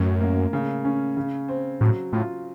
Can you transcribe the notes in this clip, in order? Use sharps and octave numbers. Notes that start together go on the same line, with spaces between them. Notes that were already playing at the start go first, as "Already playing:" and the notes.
Already playing: F#2 A2 C#4
A#3
C#3
C#4
C#3
C4
A2 F#3
A2 F4